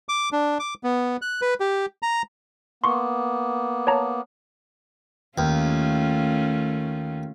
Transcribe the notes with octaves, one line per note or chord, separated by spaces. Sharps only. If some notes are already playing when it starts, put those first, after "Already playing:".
D6
D4
D6
B3
F#6
B4
G4
A#5
A#3 B3 C6 C#6
C#5 A5 A#5
D#2 A3 C#4 F4